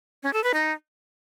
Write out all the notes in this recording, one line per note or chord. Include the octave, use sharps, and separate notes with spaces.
C#4
A4
B4
D#4